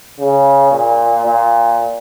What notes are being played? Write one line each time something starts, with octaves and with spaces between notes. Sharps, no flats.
C#3
A#2
A#2